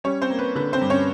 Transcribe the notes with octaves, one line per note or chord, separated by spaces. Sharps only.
G3 C#4 C#5
C4 C5
A#3
B4
D3 B4
C4 C5
G2
C#4 C#5